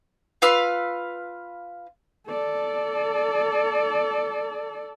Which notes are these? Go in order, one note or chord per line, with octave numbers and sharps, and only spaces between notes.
F4 B4 F5 E6
A4 D5